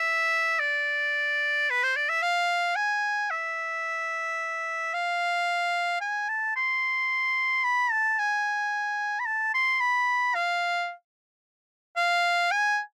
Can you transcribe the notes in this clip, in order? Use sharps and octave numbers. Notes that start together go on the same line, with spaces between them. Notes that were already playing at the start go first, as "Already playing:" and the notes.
Already playing: E5
D5
B4
C5
D5
E5
F5
G#5
E5
F5
G#5
A5
C6
B5
A5
G#5
B5
A5
C6
B5
F5
F5
G#5